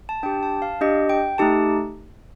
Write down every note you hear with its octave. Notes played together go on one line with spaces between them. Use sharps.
A5
D4 G4 G5
A5
F5
D4 G4 D#5
G5
A3 D#4 G4 A5